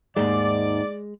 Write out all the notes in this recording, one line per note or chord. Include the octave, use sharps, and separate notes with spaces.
D#2 G#2 G#3 D5